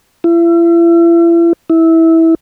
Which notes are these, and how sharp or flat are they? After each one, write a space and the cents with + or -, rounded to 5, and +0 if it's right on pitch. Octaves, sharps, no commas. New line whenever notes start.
E4 +40
E4 -15